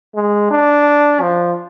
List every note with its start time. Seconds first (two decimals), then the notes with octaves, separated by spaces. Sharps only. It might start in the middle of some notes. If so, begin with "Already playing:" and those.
0.15 G#3
0.51 D4
1.21 F3